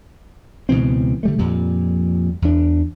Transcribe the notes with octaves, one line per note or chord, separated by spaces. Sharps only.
C#2 B2 E3 C4
D3 G3 A3
F2 A#2 G3
E2 D4